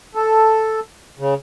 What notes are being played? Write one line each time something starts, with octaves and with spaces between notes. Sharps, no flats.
A4
C#3